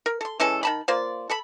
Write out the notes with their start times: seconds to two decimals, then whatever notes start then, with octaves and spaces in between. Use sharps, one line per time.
0.06 A#4
0.21 A4 C6
0.40 E3 G#3 C#4 A4
0.63 D#3 A5 B5
0.88 A#3 F4 C5 D5
1.30 A4 A5 B5